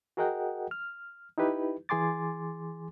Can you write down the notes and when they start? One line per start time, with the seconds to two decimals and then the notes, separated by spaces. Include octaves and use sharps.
0.17 F#4 G#4 A#4 D#5 F#5 G5
0.71 F6
1.38 D#4 E4 G4 B4
1.89 E3 G#4 G#5 C6 D6 A6